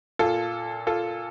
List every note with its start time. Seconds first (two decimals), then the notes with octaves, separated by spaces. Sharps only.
0.19 A#2 F4 A4
0.87 F4 A4